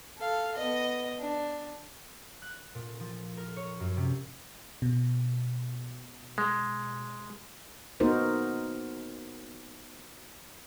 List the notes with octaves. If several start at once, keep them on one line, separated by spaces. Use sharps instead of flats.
A4 F5
B3 D#5
D4
F#6
A#2
F3
A#4
C#5
F#2
C3
B2
G#3
A#3 B3 D#4 F#4 A#4 C5